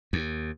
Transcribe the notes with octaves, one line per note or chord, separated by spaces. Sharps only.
D#2